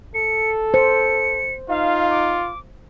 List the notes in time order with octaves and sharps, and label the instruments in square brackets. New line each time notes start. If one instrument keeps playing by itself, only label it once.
[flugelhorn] A4 [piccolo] C#7
[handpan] C5 [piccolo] C#7
[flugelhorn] D#4 [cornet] F4 [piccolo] F5
[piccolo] D6